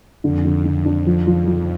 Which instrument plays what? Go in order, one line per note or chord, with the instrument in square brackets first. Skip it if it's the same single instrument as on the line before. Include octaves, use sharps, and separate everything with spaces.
[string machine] F2 [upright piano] D3
[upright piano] D3
D3
D4
F3
F3
F3